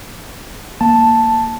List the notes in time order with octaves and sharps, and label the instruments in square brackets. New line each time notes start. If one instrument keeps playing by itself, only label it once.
[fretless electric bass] A#3 [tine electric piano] A5